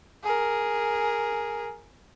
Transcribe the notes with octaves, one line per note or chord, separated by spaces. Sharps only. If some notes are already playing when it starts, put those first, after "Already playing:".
G#4 A#4